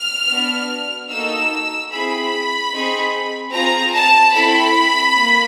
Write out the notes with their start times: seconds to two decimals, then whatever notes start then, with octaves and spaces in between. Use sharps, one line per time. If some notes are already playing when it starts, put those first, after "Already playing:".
Already playing: F6
0.29 B3 D4 F#4
1.09 A#3 D#4 F#4 A4 E6
1.91 C4 E4 G#4 B5
2.72 C4 D#4 G#4
3.52 C4 F4 G#4 A#5
3.94 A5
4.34 C4 E4 A4 B5
5.15 A#3